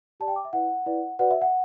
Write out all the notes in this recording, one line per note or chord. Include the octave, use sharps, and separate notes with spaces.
G4 D5 A5
G5
D6
E5
E4 B4 D5 F#5
E4 B4 D5
F#4 B4 D5 F#5
E5
F#5